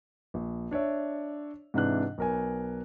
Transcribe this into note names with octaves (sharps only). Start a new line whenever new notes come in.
A#1
D4 C#5 D5 E5
G#2 C3 E3 D4 F#6
B1 A#4 G#5